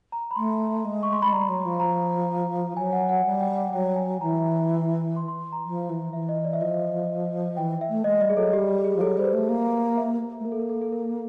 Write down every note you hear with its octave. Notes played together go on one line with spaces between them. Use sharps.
A#5
B5
A3 C6
G#3
C#6
C6
G#3 B5
G3 A#5
F#3
F3
A#5
F#3 G#5
F#5
F#5
G3
G5
F#5
F#3 G5
G#5
E3 A#5
C6
C6
A#5
F3
E3
E3 E5
D#5
D5
E5
F3 D#5
E3 G5
E5
A3
G#3 D#5
G3 D#5
G#4
F#3 A4
G3 G4
G4
G#4
F3
F#3 A4
G3 C5
B4
A3
A#3
E5
A3
A#3 A#4
A4
A#4
A4
A4
A#4